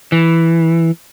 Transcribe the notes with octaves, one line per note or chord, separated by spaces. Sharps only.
E3